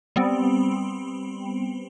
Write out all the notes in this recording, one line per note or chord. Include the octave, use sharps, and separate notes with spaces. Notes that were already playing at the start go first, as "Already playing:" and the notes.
G3 B3 C4